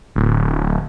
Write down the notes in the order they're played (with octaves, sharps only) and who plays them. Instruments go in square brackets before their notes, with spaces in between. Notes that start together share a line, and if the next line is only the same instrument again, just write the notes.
[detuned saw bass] D1